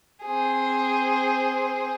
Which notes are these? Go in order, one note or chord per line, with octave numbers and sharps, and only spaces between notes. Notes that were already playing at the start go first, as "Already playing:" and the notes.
C4 G#4